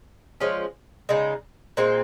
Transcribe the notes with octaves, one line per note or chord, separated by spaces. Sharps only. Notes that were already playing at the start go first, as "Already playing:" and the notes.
F3 G#3 C#4
C#3 G#3 D#4
A#2 G#3 C4